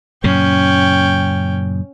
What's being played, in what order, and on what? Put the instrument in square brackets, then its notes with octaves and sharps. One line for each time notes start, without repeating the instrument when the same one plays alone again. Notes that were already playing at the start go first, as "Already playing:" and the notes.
[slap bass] F#2 A#2 C#3 [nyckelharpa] C#4 G5